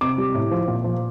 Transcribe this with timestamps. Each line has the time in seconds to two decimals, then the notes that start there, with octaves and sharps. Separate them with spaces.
0.01 C3 D6
0.18 G3
0.34 A2
0.51 F3
0.68 A#2
0.84 F3